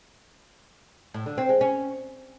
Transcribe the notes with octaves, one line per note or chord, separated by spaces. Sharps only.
A2
D3
C4
G#3
C#4